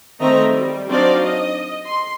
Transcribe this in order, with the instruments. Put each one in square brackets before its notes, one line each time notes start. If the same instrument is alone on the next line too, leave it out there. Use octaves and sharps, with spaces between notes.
[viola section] D#3 A3 C4 D#5 E5 A#5
G3
F#3 C4 D4 D#4 D5 F5
D#5
C6